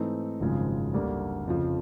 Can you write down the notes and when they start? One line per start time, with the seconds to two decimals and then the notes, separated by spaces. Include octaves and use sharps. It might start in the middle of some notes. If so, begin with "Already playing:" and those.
Already playing: G#2 E3 A3 C4 D#4
0.40 G#1 F#2 C#3 F3 G#3
0.94 D2 D3 G3 A#3
1.47 F2 C#3 F3